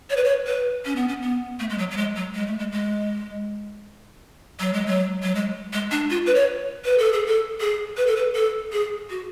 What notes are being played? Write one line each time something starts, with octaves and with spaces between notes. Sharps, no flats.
C#5
B4
C#5
B4
C#4
B3
C#4
B3
A3
G#3
F#3
F#3
G#3
F#3
G#3
A3
G#3
G#3
F#3
G#3
F#3
F#3
G#3
G#3
D4
F4
B4
C#5
B4
A4
G#4
A4
G#4
B4
A4
B4
A4
G#4
F#4